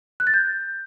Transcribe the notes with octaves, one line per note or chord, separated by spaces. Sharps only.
F#6
A6
G6